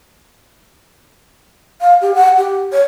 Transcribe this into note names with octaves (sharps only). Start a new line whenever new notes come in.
F5
G4
F#5
G4
C#5